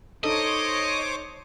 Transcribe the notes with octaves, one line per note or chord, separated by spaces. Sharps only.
D#4 A4 C5 C#5 D#5 D6